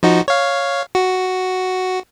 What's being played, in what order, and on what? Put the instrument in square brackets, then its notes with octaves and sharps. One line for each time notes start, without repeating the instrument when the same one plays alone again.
[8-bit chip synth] F3 D#4 F#4
C#5 F5
F#4